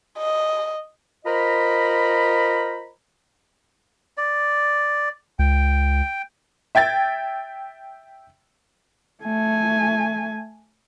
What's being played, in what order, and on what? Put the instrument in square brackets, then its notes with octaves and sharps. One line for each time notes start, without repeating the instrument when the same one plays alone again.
[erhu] D#5
[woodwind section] F4 A#4 C5 D#5 A#5 B5
[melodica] D5
[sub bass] C#2 [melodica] G5
[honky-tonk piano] E5 G5 G#6 A6
[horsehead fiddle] A3 G#5